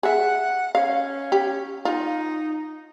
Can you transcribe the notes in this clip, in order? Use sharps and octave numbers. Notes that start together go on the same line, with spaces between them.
G#4 E5 F#5
C#4 F5
G4
D#4 F4